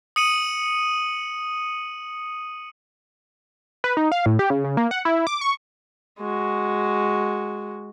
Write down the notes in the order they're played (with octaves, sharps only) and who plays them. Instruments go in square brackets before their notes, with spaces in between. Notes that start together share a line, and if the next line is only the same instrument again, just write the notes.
[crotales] D#6 C#7 D#7 F#7
[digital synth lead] B4
D#4
F5
A2
G4
C#3
C#3
A#3
F#5
E4
D6
C#6
[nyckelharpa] G#3 F#4